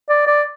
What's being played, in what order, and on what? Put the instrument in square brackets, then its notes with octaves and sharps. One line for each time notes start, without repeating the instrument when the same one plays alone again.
[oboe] D5
D5